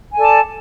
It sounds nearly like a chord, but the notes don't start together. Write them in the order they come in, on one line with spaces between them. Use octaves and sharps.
G#5 A4 D5 A5